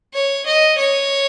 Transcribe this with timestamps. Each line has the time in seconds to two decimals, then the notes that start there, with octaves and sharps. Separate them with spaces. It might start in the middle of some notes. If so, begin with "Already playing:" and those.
0.14 C#5
0.46 D#5
0.78 C#5